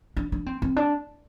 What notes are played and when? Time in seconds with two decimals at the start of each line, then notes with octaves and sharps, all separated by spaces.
0.17 D4
0.32 D4
0.46 C4
0.62 C4
0.76 D4